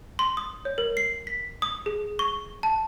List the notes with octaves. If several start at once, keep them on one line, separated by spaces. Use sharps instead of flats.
C6
D#6
C#5
A#4
C7
B6
D#6
G#4
C#6
A5